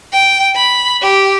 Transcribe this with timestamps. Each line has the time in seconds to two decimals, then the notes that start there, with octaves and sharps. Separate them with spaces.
0.13 G5
0.56 B5
1.02 G4